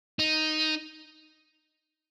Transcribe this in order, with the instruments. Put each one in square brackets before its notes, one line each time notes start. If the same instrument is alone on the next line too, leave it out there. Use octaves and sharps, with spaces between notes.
[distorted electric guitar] D#4